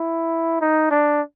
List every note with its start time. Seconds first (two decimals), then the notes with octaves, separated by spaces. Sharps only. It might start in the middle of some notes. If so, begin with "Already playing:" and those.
Already playing: E4
0.61 D#4
0.91 D4